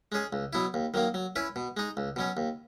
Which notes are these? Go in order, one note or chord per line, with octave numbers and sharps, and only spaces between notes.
G#3 C#4 G#4
C#2
B2 F#3 B3 E4
D#2
D#3 F#3 A#3
F#3
C#4 E4 B4
B2
G#3 D#4
C#2
B2 F#3 C#4
D#2